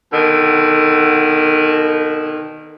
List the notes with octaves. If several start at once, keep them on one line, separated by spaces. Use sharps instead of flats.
B2 D3 D#3